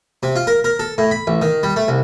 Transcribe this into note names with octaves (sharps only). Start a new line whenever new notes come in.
C3
F4
A#4
A#4
A4
A2
B5
A1
D#3
G3
A3
C2